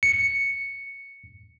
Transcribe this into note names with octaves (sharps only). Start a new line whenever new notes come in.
C#7